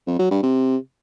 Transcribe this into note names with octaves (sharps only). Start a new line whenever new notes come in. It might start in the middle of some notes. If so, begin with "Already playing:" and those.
F2
F#3
G2
C3